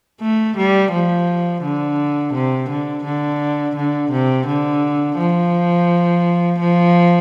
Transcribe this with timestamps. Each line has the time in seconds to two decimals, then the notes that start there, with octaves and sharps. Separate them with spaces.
0.21 A3
0.57 G3
0.92 F3
1.63 D3
2.34 C3
2.69 D3
3.04 D3
3.76 D3
4.11 C3
4.47 D3
5.17 F3
6.59 F3